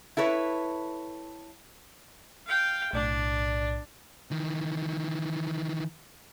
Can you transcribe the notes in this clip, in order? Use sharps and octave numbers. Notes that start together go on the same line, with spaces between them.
E4 A4 B4 C#5
F5 G5
B1 A2 D4 D5
D#3 E3